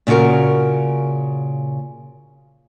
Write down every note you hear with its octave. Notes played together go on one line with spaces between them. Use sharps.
A#2 C#3 F4 F#4 A#4